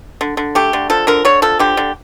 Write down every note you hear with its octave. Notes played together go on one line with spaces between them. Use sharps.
D3
D3
A3 G4
D3
F3 A4
D3 A#4
D3 C#5
F3 A4
D3 G4
D3